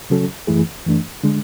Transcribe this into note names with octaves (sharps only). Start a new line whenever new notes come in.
C#3 F#3 C#4 F#4 A4
F#2 E3 A3 E4 G#4
F#2 E3 A3 D4
D3 G#3 D4